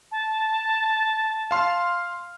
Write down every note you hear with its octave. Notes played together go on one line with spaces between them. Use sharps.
A5
F5 C6 F6